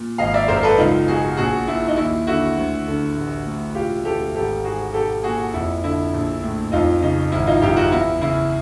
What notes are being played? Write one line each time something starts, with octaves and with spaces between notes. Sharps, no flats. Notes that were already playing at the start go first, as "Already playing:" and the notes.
Already playing: A#2
G#1 D#5 F5
D5 E5
F#2 A#4 C5
A4 B4
C#2 D#4 F4
B2 F#4 G#4
A#1 F#4 G#4
A#2 E4
D#4
D#2 E4
D3 E4 F#4
D2
D3
A1
A2
E1 F4 G4
D2 G4 A4
G#1 G4 A4
G#2 F#4 G#4
B1 G4 A4
A#2 F#4 G#4
F2 E4
D3 E4
A#1
A2
F2 D#4 F4
C#3 D#4
G#1 E4
D#4 F4
F#2 F4 G4
E4 F#4
E2 E4
C#3 E4